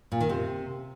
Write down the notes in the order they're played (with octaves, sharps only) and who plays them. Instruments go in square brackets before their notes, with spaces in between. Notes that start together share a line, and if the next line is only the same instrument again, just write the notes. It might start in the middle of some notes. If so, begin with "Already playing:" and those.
[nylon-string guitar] A#2
D#3
C3